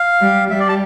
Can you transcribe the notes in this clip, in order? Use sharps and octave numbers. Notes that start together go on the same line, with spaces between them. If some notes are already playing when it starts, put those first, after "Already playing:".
Already playing: F5
G3
G3 E5
D5
A5